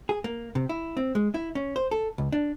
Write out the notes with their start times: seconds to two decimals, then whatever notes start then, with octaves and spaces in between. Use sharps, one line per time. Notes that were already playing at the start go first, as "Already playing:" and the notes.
0.09 G#4
0.24 A#3
0.55 C3
0.69 E4
0.97 C4
1.15 G#3
1.34 E4
1.55 C#4
1.76 C5
1.91 A4
2.18 C#2
2.32 D4